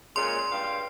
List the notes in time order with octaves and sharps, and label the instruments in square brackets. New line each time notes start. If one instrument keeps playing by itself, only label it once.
[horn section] A#2 C#3 G#3 [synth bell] C6
[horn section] G2 F5 G5